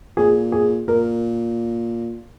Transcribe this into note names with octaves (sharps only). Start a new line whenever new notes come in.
A#2 G#4
G#4
A#2 A#4